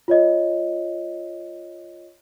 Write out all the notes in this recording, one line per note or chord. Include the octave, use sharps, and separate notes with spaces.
F4 C#5 D#5